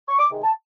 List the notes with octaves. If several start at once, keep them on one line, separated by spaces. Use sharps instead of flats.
C#6
D6
C3 D#3 G#3
A5